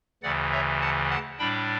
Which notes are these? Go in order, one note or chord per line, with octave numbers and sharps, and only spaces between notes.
D2 C#3 E3 D5 F#5
C#5 E5
F#5 A5
F#5 A5
A2 G3 D4 G5 B5